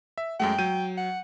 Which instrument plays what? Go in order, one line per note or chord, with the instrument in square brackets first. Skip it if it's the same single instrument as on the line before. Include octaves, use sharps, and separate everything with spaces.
[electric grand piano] E5
[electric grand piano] F#2 G#3 A3 [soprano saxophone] G5
[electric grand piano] F#3 G6 D#7
[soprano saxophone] F#5